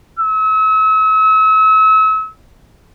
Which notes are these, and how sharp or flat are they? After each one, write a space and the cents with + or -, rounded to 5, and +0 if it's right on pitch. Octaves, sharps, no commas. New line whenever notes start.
E6 -40